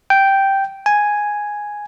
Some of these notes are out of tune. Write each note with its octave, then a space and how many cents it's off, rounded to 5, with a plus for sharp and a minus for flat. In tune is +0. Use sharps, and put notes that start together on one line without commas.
G5 -5
G#5 +0